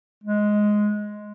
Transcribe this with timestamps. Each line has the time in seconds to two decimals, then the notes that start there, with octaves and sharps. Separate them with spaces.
0.24 G#3